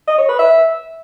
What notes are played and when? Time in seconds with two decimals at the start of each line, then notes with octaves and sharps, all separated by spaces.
0.08 D#5
0.18 C#5
0.29 B4
0.39 E5